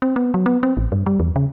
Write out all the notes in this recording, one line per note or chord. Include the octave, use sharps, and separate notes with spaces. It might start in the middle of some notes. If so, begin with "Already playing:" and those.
C4
B3
F#3
B3
C4
A1
G2
G3
E2
C#3